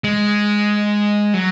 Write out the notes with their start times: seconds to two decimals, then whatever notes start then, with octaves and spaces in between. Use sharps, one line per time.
0.04 G#3
1.34 F#3